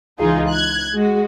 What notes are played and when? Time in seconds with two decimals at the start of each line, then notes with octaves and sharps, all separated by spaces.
0.19 C#2 E3 D#4 F4 G#4
0.49 F#6 G#6
0.95 G#3 F#4